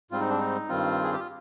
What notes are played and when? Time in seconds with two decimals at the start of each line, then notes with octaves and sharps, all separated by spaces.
0.11 G#2 G3 C4 F4
0.21 D#4
0.30 D4
0.39 D#4
0.69 G2 D#3 G3 C4 F4
1.03 G#4
1.12 G4
1.20 F4